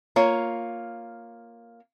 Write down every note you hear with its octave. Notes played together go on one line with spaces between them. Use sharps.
A#3 F4 C#5